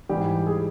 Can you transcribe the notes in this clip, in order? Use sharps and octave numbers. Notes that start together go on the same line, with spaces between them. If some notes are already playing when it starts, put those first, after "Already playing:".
G#2 E3 G3 G4
G#4